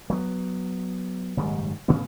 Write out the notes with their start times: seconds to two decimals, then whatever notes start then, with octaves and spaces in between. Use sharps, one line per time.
0.10 F#3 B3
1.37 F#1 G#2 D#3 G3
1.88 A2 C#3 B3 C#4